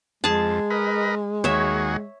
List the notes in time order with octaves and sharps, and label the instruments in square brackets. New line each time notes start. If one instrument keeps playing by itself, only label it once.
[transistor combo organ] F2 [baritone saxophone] G#3 [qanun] G#4 A5
[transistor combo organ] A#4 B4 D#5
[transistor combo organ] D#2 F#4 G#4 [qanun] C#5 E5